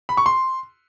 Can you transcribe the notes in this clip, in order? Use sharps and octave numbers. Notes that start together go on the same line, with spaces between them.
B5
C#6
C6